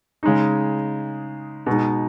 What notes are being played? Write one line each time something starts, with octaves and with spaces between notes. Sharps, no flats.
C#3 G#3 D#4
B2 G#3 D#4